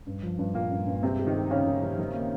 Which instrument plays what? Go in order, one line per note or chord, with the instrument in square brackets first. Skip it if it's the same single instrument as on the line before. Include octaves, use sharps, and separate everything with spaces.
[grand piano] G2
F3
G2
[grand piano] G2 [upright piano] A#2 A#3
[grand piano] G2
G2
[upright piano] C3 C4 [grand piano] G#3
[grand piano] G4
[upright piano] D#3 D#4
[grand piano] G4
[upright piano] C#3 C#4 [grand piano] D#4
[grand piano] D#3
D#3
D#3
A#3